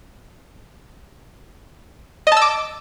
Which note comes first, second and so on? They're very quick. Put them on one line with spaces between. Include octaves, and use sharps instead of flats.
D#5 A5 E6 D6